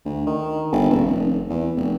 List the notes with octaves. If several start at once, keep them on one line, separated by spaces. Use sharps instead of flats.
D2
D#3
G1
D#1
F1
E2
F1